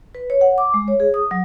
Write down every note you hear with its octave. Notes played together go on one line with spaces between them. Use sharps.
B4
C#5
F#5
D6
G#3
C#5
G#4
D#6
F#3